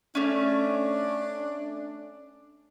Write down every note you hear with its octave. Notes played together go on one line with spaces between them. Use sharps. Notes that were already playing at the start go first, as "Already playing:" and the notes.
A3 C#4 D4